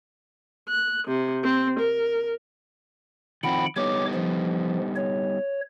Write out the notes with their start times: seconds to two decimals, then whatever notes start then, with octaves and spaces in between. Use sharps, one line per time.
0.69 F#6
1.07 C3
1.44 C4
1.79 A#4
3.43 D#3 F3 C4 F#5 G5 B5
3.76 G3 B3 D#4 C#5 D6
4.14 F3
4.96 C#5